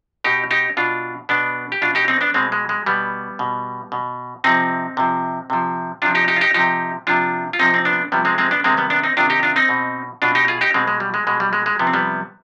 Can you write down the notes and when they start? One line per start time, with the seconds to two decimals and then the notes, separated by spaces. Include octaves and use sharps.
0.24 B2 D#4 G4
0.51 D#4 G4
0.77 B2 D4 F4
1.29 B2 B3 D4
1.72 G4
1.82 B2 D4 F4
1.95 D#4 G4
2.08 C4 D#4
2.21 B3 D4
2.34 B2 G#3 C4
2.52 G#3
2.69 G#3
2.86 B2 G3 B3
3.39 B2
3.92 B2
4.44 C3 F3 C4 D#4
4.97 C3 F3
5.50 C3 F3
6.02 C3 F3 D4 F4
6.15 D#4 G4
6.28 D#4 G4
6.36 F4
6.41 D#4 G4
6.54 C3 F3 D#4 G4
7.07 C3 F3 D4 F4
7.53 F4
7.59 C3 F3 C4 D#4
7.74 C4
7.85 B3 D4
8.12 C3 F3 G3 B3
8.25 G#3 C4
8.38 G#3 C4
8.51 B3 D4
8.64 C3 D#3 G#3 C4
8.77 G3 B3
8.90 B3 D4
9.03 C4 D#4
9.17 C3 D#3 D4 F4
9.30 D#4 G4
9.43 D4 F4
9.56 C4 D#4
9.69 B2
10.22 B2 D4 F4
10.35 D#4 G4
10.48 F4 G#4
10.61 D#4 G4
10.74 B2 G#3 C4
10.87 G#3
11.00 G3
11.14 G#3
11.27 B2 G#3
11.40 G3
11.53 G#3
11.66 G#3
11.79 C3 F3 B3
11.87 C4
11.94 G3 B3